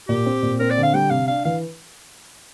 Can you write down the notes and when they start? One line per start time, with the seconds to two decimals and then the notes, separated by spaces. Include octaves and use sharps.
0.08 A#2 G4
0.26 C4
0.42 A#2
0.60 C4 A#4
0.71 D5
0.77 D3
0.83 F5
0.94 G3 G5
1.10 C3 F5
1.28 D4 F5
1.45 E3 F5